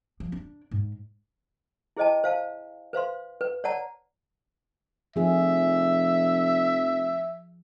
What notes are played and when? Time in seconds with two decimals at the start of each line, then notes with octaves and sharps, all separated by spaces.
0.20 F3
0.32 D4
0.71 G#2
1.97 E4 G#4 C5 D#5 G5 A5
2.24 C5 F5 A5
2.93 B4 C5 F5 C6
3.41 B4
3.64 C#5 D5 F#5 A5 A#5
5.16 F1 F3 G#4 E5